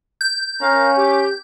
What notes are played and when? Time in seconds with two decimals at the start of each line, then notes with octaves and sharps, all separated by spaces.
0.21 G6
0.61 C#4 A#4 F5 A#5
0.98 G4